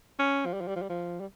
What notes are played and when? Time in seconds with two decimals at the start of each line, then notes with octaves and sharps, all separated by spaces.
0.19 C#4
0.46 F3
0.53 G3
0.61 F3
0.68 G3
0.76 F3
0.82 G3
0.89 F3
1.20 G3